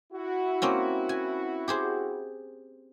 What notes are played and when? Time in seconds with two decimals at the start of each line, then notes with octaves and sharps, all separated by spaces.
0.13 E4 F#4
0.62 A#3 C4 C#4
1.09 G#5
1.68 G4 G#4 C5